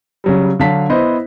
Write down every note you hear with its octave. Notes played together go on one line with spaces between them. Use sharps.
C#3 F#3 G3
D3 F#3 F5 A5 B6
B3 E4 C5 D#5